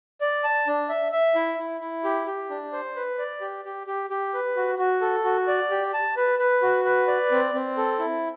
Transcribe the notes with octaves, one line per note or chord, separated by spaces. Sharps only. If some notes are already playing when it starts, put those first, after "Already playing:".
D5
A5
D4
E5
E5
E4
E4
E4
G4
G4
D4
C5
B4
D5
G4
G4
G4
G4
B4
F#4
F#4
A4
F#4
D5
G4
A5
B4
B4
F#4
B4
D5
C4
C4
A4
E4